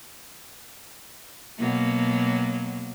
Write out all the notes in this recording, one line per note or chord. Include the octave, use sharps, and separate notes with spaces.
B2 F#3 A#3